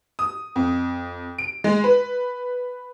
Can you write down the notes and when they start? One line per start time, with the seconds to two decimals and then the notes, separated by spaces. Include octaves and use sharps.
0.19 D#6
0.56 F2
1.38 D7
1.64 G#3
1.84 B4